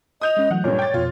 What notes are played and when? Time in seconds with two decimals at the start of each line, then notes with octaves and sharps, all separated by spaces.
0.21 D#5 D#6 G6 F7
0.37 G#3 C#4
0.51 E3 F#3 A3 F#5
0.64 G2 A#2 A4 C#5 D6
0.79 G5 A6
0.94 F2 B2 F4